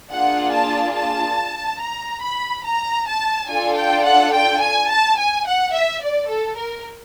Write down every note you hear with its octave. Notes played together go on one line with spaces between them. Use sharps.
A#3 D4 F4 G#4 F#5
A5
A5
A#5
B5
A#5
A5
D4 F4 A4 G#5
G5
F#5
G5
G#5
A5
G#5
F#5
E5
D5
A4
A#4